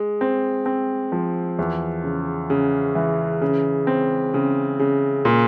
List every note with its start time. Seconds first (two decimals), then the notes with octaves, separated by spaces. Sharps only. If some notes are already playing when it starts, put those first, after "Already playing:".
Already playing: G#3
0.21 C4
0.66 C4
1.12 F3
1.59 E2
2.04 C#3
2.50 C#3
2.95 E3
3.41 C#3
3.87 C4
4.34 C#3
4.79 C#3
5.25 A#2